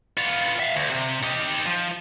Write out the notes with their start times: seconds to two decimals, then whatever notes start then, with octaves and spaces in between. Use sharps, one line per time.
0.18 B3 F4
0.60 E5 F5
0.76 D2
0.91 C3
1.23 D#4 G4
1.66 F3